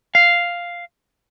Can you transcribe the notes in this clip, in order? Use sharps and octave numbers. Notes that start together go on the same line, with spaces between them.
F5